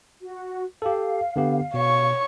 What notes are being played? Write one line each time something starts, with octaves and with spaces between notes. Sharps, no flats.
F#4
G4 A4 F5
D3 B3 G4
B2 C#5 C#6